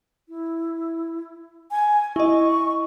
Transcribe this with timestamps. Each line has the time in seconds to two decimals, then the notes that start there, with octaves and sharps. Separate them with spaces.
0.29 E4
1.71 G#5
2.16 E4 D#5 C#6